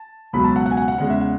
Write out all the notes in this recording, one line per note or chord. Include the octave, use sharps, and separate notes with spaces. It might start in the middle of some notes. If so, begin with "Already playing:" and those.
Already playing: A5
C#2 B2 F#3 B5
A5
F#5
F#5
G#5
F#5
F#5
E2 C#3 G#3 F#5
E5
F#5